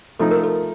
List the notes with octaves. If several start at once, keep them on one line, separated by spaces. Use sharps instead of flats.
F3 A3 D#4 A4
A#4
A4